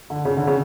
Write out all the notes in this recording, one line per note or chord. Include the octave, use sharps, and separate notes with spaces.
D3
C#3
D3
C#3